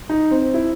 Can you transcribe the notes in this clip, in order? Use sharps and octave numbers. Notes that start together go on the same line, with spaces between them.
D#4
C4
E4